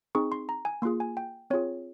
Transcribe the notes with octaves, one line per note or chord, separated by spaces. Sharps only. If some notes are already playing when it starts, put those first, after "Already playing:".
C4 D#4 G#4 C#6
C6
A#5
G#5
A#3 F4 G#4 C6
G#5
G5
C4 F4 G#4 C#5